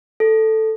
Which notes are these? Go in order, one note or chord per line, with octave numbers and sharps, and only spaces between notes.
A4